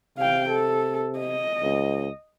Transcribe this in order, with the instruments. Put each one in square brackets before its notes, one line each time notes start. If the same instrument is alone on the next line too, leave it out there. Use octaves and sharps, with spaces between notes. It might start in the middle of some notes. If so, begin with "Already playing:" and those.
[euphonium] C3 [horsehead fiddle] F5 G5
[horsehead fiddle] A4
D#5
[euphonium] C#2